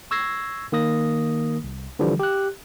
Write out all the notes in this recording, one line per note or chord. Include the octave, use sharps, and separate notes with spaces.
C#6 E6 G#6 A#6 C7
D#3 A#3 D#6 A#6
C2
D3 E3 F3 G3
G4 F#6